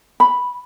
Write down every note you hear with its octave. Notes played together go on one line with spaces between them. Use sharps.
B5